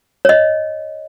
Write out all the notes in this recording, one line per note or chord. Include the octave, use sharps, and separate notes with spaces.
C#5 D#5